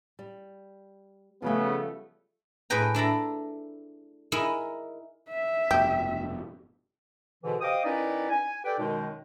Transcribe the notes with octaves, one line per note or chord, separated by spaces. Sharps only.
G3
C#3 F3 G3 A3 B3
A2 G#4 B4 G5 A#5
D4 E4 A4 A#5
D#4 E4 G#4 A#4
E5
F1 G2 B2 G4
G#2 B2 D3 E3
G4 C5 D#5 F5 D6 D#6
D#3 C#4 D#4 E4 B4 D5
G#5
G4 A4 B4 D5 G5
F#2 B2 D#3 G#3 D#4